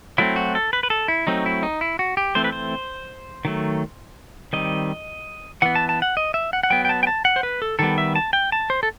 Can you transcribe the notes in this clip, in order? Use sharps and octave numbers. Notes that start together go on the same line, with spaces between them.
F#3 A3 C4 E4
F#4
A4
B4
B4
A4
E4
F#3 A3 C4 D#4
E4
D#4
E4
F#4
G4
E3 A3 C4 C5
B4
C5
D#3 F#3 A3
D#3 G3 C4 D#5
E3 B3 F#5
A5
A5
F#5
D#5
E5
F#5
F#5
F#3 B3 G5
G5
A5
G5
A5
F#5
C5
B4
A4
D#3 G3 B3 A4
E5
A5
G5
A5
C5
A4